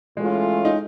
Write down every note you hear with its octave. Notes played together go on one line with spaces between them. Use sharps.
A2 E3 G#3 A3 C#4 F4
D#4